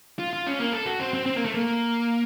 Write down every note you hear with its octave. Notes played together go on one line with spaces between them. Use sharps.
F4
F4
C#4
A#3
A4
F#4
C4
C4
C4
A#3
A3
A#3